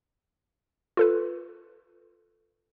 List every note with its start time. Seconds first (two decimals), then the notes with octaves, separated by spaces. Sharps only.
0.97 F4 A4 B4